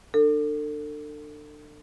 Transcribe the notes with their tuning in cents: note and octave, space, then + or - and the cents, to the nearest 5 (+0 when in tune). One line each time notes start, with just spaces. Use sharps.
D4 +30 A4 +35